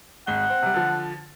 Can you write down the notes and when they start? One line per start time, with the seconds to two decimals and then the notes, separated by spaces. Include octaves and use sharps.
0.27 G#1 G#3 F#5 G7
0.50 C4
0.63 C3 G3
0.74 D3 F3